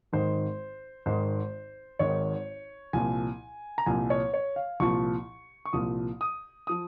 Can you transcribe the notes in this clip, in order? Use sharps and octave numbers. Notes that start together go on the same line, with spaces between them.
G#1 G#2 D#3 C5
G#1 G#2 D#3 C5
G#1 G#2 D#3 C#5
C2 A#2 F3 G#5
A#5
C2 A#2 F3 G#5
C#5
C#5
F5
C2 A#2 F3 C#6
C#6
C2 A#2 F3 D#6
D#6
F3 D#6